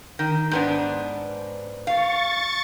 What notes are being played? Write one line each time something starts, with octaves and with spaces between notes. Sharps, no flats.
D#3
G#2 B3 D4
F5 C#6 A6